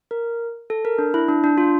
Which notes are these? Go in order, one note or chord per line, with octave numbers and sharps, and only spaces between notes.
A#4
A4
A#4
D4
E4
D4
D4
F4